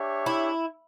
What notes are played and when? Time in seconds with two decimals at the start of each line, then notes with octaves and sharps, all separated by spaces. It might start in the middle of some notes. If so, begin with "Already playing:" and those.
Already playing: D4 G4 C#5 E5
0.26 E4